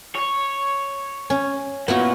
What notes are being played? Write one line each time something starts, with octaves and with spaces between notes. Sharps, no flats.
C#5
C#4
A#2 B3 E4 F#4